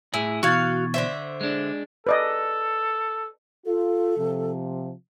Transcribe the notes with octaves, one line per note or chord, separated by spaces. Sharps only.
A2 E4 G#4
B2 E3 F#4 F5 C#6 G#6 A6
D3 C5 E5
G#3 D4
A4 B4 D5 D#5
F4 A4
C3 F3